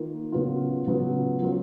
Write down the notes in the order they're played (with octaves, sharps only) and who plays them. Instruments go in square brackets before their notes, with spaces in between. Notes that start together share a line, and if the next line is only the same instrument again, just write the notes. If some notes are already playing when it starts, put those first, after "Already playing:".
Already playing: [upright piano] D#3 A#3 F4
C#3 F#3 B3 F4
C#3 F#3 B3 F4
F#3 A#3 F4